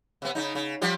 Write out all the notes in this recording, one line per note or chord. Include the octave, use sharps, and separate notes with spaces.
C3 B3
C#3 D#4
C#3
F3 G3 G4